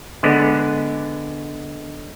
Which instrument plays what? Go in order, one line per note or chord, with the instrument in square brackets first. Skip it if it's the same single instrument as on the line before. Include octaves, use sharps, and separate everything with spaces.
[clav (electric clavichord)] D3 G#3 B3